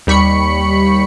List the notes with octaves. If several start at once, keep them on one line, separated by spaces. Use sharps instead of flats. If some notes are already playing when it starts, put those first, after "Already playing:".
D#2 G3 B5 C#6 C#7